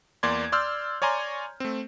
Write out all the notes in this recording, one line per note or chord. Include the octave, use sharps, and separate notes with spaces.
E2 A#3 D5 C6 G#6
D5 C6 E6 F6 G6
C#5 D5 G#5 A#5 C6
A3 C4